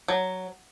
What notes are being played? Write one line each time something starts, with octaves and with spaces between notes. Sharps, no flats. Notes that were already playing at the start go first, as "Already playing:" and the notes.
F#3